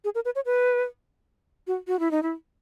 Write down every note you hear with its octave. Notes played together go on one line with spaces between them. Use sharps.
G#4
A#4
B4
C#5
B4
F#4
F#4
E4
D#4
E4